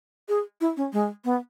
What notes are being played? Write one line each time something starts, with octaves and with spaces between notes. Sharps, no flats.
G#4
E4
C#4
G#3
B3